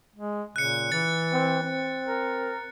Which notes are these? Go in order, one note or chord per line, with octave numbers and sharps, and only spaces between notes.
G#3
A#2 C#3 F#6 C#7
E3 A6
C4
C4
A#4